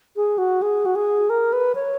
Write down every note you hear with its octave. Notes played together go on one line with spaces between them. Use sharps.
G#4
F#4
G#4
F#4
G#4
A#4
B4
C#5